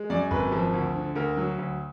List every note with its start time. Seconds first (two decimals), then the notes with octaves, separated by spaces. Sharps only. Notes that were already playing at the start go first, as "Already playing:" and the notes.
Already playing: G#3
0.10 F#2 D5
0.31 G#1 B4
0.52 F3
0.74 D2
0.95 D3
1.16 D2 A#4
1.37 F#3
1.58 D2